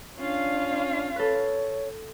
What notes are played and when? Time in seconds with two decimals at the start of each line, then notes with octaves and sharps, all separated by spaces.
0.19 C#4 D4 F4 F5
1.16 A4 B4 C#5